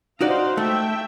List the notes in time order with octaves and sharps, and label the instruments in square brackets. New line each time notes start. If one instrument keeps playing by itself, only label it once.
[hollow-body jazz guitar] D#4 F#4 D5 [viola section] C5 F5
[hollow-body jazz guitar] A3 [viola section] E5 G5